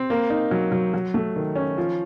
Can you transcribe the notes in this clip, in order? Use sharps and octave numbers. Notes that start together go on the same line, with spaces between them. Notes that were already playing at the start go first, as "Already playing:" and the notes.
Already playing: C4
A#3
D#4
F#3
F#3
F#3
A3
D#3
C#4
F3